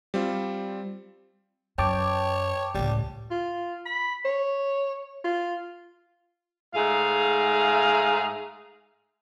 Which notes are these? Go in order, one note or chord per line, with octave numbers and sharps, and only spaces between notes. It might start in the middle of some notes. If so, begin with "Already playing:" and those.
G3 C4 F4
F#2 C#5 G5 A5 D6
C#2 A2 G3
F4
B5
C#5
F4
G#2 A3 G#4 F5